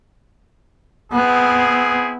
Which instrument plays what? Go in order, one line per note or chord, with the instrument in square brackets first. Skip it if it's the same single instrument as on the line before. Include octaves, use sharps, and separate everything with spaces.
[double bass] B3 [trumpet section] C4 E4 G#4